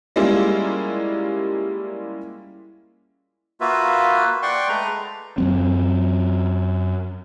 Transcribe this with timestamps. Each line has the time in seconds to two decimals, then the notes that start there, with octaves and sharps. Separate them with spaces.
0.16 G3 G#3 A#3 C#4 E4 F4
3.61 A#3 F4 F#4 B4 E5
4.42 D5 F#5 G5 C6 C#6
4.69 G#3 A3 B4 A#5
5.38 F#2 F#3 C4